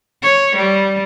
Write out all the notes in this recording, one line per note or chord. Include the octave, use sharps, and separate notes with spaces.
C#5
G3